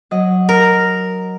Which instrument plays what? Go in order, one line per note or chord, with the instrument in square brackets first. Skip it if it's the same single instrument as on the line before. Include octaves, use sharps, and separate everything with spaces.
[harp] F#3 D#5 F#5
[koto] A#4